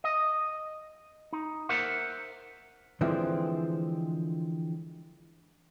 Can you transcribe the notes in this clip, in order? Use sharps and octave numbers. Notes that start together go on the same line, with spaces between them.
D#5
D#4
A#4 C5 E5 F#5
D3 E3 F3 G#3 C4